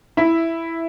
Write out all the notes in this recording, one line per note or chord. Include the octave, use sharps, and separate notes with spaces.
E4 E5